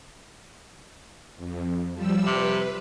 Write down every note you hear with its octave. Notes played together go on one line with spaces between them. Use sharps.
F2
F3 G3 E6
C3 B4